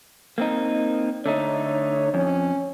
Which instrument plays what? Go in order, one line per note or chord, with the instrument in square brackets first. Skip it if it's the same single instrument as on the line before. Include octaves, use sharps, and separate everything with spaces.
[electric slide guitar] A#3 C4 D#4
[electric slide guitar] D3 A3 D#4 [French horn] C#5
[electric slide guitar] F2 [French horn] C#4